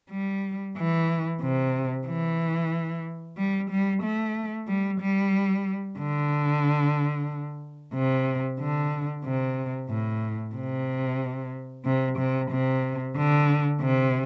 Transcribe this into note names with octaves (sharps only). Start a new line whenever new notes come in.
G3
E3
C3
E3
G3
G3
A3
G3
G3
D3
C3
D3
C3
A2
C3
C3
C3
C3
D3
C3